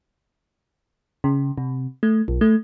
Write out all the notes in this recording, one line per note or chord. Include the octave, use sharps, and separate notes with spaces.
C#3
C3
A3
B1
A3